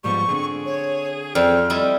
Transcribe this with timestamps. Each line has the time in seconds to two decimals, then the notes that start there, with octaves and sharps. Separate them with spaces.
0.04 G#2 F3 G3 B3 C#6
0.29 D3 C4 G#4
0.66 C#5
1.35 F2 C4 D5 F6
1.70 G3 E4 D#5